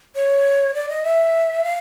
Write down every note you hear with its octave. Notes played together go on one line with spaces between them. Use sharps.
C#5
D5
D#5
E5
F5